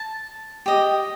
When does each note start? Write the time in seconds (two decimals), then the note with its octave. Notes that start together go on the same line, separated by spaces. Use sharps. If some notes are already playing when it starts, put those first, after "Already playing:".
Already playing: A5
0.66 G4 D#5